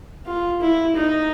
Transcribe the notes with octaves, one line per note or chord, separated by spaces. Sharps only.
F4
E4
D#4